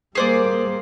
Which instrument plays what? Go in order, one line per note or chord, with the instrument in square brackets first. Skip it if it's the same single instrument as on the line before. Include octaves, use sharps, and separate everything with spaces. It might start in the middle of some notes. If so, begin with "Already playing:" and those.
[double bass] G3 A#3 [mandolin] G#4 C5 D5